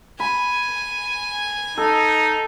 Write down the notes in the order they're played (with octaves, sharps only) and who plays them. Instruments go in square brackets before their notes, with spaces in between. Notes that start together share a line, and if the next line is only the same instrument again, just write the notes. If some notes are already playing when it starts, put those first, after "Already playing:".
[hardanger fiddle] G#5 [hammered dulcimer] B5
[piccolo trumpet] D#4 [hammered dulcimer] A4